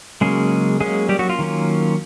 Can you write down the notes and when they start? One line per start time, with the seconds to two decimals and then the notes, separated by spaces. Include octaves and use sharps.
0.21 C#3 F#3 G#3 A#3 C#4 G#4
0.80 F#3 G#3 A#3 C#4 G#4
1.09 G3 G4
1.19 F#3 F#4
1.29 F4
1.39 D#3 F#3 A#3 C#4